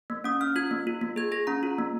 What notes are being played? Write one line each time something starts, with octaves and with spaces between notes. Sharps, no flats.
A#3
C#4 D#6
C#4 F6
F4 G#6
A#3
F4
A#3
G#4 G#6
G#4 A#6
C#4 A#5
F4
A#3